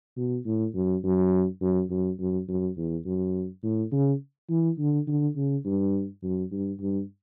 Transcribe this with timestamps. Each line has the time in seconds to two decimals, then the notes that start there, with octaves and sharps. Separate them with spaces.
0.17 B2
0.46 A2
0.75 F#2
1.04 F#2
1.62 F#2
1.91 F#2
2.20 F#2
2.48 F#2
2.77 E2
3.06 F#2
3.64 A2
3.92 C#3
4.50 E3
4.79 D3
5.08 D3
5.36 C#3
5.66 G2
6.23 F#2
6.52 G2
6.81 G2